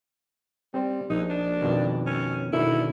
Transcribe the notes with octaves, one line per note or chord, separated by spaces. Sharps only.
G3 C4 C5
A#1 D#4
D4
F2 B2 D#3
C#4
B2 D3 D#3 E4